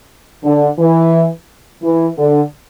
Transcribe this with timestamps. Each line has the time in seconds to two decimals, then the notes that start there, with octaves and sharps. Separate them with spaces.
0.44 D3
0.79 E3
1.83 E3
2.18 D3